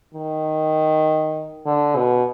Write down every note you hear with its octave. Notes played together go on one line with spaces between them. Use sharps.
D#3
D3
B2